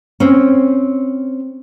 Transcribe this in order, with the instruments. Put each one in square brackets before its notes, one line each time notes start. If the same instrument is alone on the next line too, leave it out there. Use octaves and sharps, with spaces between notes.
[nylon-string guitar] C4 C#4